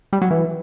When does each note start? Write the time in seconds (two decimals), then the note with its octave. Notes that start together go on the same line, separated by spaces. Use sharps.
0.13 G3
0.22 F#3
0.31 E3